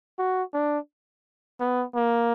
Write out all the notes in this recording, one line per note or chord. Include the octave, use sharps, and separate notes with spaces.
F#4
D4
B3
A#3